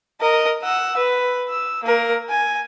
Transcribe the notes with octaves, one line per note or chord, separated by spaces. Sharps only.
A#4 D#5
F#5 E6
B4
E6
A#3 A#4
G#5